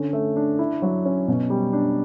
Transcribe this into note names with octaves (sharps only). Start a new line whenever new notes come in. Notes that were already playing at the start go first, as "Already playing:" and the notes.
Already playing: D3 C#4
A3
D4
E4
F#3
C#4
B2
G3
D4